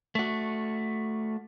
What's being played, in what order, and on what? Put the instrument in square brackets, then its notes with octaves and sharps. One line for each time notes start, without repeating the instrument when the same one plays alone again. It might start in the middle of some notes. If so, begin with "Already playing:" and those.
[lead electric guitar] A3 F#4